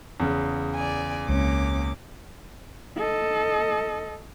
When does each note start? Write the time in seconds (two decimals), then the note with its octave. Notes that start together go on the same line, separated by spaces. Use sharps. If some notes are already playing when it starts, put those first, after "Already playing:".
0.20 E2 C#3
0.75 D5 G#5
1.28 C#2 G#3 A#3 C4 C#4 D6
2.97 A4 D#5